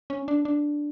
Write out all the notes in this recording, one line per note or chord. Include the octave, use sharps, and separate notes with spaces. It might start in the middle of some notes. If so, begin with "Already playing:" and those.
C#4
D4
D4